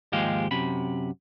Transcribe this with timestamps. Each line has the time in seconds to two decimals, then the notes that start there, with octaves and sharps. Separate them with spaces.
0.12 D#2 G#2 F3 G#3 G4 F5
0.51 F#2 C3 B5